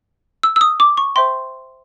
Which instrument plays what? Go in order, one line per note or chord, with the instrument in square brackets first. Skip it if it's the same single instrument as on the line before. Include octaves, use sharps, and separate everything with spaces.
[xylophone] E6
E6
D#6
D6
C#6
C5 E5 G5 C6